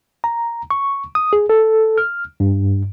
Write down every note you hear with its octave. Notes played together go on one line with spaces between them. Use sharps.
A#5
C#6
D#6
G#4
A4
F6
G2